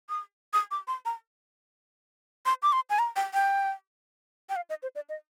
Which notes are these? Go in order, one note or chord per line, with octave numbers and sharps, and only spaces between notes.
D#6
D#6
D6
C6
A#5
C6
D6
C6
G#5
A#5
G5
G5
G5
F5
D#5
C5
D5
D#5